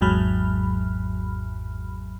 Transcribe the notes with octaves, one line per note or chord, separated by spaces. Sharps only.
G#1 E2 G#2 F#3 B5 F6